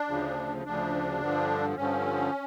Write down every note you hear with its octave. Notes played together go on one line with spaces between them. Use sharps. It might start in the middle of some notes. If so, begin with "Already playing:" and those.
Already playing: D4
D2 C#3 F3
D2 C#3 F3 D4
G2 D3 F3
G2 D3 F3 C#4